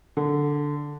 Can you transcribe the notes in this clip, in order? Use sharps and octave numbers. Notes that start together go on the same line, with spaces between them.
D3